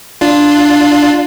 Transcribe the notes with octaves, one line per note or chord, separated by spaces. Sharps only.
D4 F4